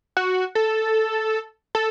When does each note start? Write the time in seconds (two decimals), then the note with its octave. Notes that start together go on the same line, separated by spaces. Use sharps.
0.17 F#4
0.55 A4
1.75 A4